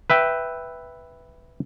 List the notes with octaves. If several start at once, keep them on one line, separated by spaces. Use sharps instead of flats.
B4 E5 G5